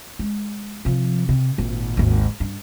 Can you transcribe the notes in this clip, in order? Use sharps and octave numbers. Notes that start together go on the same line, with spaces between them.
G#3
C3 F3
C3
G#1 A#2
G#1 D#2
G2